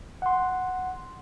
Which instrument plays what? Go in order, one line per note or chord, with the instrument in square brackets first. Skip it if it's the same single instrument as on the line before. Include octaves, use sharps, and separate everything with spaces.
[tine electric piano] F#5 C6